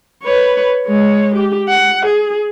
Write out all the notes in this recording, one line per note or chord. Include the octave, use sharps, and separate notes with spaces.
B4 C#5
G#3 C#5
G4
F#5
G#4